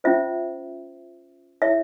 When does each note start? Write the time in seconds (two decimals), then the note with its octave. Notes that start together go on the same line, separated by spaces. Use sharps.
0.04 C#4 F4 C5 E5
1.62 E4 G#4 C#5 E5